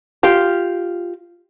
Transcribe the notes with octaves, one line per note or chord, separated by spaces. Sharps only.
F4 G4